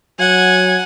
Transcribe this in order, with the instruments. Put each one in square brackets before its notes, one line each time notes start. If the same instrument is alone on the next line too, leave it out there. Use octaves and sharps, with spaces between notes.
[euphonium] F#3 [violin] F#5 G#5 [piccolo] G#6